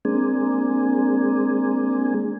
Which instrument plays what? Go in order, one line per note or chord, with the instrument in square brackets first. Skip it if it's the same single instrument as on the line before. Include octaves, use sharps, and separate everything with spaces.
[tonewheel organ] G#3 A#3 C4 D4 G#4